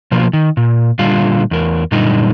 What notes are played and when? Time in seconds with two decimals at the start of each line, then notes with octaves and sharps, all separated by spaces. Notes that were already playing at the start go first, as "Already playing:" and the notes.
0.12 B2 F3 A#3
0.33 D#3
0.57 A#2
0.99 A#2 D3 G3 F4 F5
1.51 E2 A#4
1.92 F#2 A#2 D3 G3 D#4